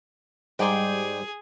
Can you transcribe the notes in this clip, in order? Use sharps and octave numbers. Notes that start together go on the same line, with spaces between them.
G#2 G3 G#4 C5 D5 G5